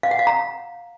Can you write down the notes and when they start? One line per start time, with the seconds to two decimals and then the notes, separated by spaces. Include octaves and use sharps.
0.03 F5
0.11 F#5
0.19 F5
0.27 A#5